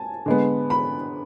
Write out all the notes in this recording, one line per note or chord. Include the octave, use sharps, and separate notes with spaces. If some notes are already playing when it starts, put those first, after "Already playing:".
Already playing: G#5 A5
D3 G#3 B3
B5